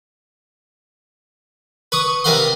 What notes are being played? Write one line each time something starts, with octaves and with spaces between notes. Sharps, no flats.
B4 C#6 D#6
C3 A#4 B4 F5 F#5 C6